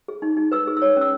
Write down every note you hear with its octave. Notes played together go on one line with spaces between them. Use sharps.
G#4
D#4
D#4
B4 E6
G#4
E6
C#5
C#4 E6